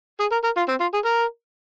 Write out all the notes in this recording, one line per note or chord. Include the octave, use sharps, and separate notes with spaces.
G#4
A#4
A#4
F4
C4
F4
G#4
A#4